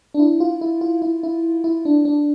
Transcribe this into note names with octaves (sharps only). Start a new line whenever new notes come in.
D4
E4
F4
E4
F4
E4
E4
E4
D4
D4